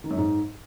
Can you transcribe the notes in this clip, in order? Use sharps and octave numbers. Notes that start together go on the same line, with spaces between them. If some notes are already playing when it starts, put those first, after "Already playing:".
D#3
F#2
G#2